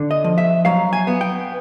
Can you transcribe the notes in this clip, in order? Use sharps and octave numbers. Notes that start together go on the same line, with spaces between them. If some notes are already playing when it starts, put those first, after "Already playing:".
Already playing: D3
D#5
F3
E5
F#3 F5
G#5
B3
G5